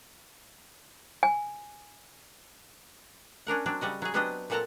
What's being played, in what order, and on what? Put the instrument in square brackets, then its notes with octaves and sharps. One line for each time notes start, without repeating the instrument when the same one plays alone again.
[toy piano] G#5
[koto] C#4 D4 A#4 F#5
F#3 C4 D4
C#3 G3 F#4 D#5
F#3 G#4
F#3 B3 C4 D4 G4 D#5
A#2 C4 A4 F#5 A5 A#5